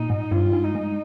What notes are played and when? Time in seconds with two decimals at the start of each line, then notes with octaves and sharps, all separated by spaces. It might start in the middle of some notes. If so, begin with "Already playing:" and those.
Already playing: A#2 D#4
0.10 G#2
0.31 G2 F4
0.53 G#2
0.64 D#4
0.75 G#2